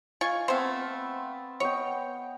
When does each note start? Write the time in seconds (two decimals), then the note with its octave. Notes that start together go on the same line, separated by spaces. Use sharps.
0.21 F4 D#5 G#5 C#6
0.48 A3 B3 C4 C5 F5
1.60 B3 C#5 D#5 G5